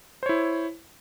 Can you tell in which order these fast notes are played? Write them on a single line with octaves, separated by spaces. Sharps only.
C5 C#5 E4